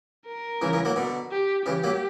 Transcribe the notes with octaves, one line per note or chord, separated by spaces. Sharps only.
A#4
C#3 E3
C#3 E3
F#3 A#3
B2 D3
G4
C#3 E3 G4
F#3 A#3